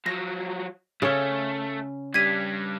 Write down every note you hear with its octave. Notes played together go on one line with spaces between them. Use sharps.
F3 F#3 A#6
C#3 A3 C#4
G2 G3 G#6 B6 D#7